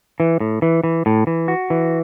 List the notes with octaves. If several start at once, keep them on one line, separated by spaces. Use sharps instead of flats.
E3
A2
E3
E3
A2
E3
F#4
E3